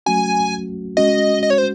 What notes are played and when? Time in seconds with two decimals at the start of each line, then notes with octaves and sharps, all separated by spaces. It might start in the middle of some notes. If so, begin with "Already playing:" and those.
0.06 F#3 A3 C#4 F#4 G#5
0.97 G#3 C#4 F#4 D#5
1.43 D#5
1.50 C#5
1.58 C5